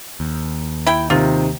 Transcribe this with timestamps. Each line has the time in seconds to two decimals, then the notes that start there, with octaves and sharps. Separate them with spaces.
0.20 D#2
0.87 E4 G5
1.10 C3 D#3 F4